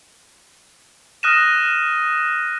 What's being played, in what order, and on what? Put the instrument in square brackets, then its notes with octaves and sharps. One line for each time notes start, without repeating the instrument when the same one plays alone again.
[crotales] D#6 F6 F#6 A#6 D#7 E7